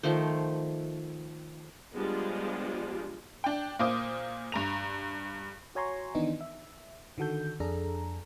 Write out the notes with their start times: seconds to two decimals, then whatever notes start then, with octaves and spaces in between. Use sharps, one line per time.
0.03 D#3 F3 A3 C5
1.94 F3 G3 G#3 B3 D4 F4
3.44 D4 G5
3.79 A#2 A#3 F4 C5 D6 D#6
4.52 G2 A#5 F7
5.75 F#4 C#5 G#5 A#5 C6 C#6
6.15 D#3 E3 B3 D4 D#4
6.41 E5
7.18 D3 D#3 F#4 A4 G6
7.60 F2 D4 G#4 A4 A#5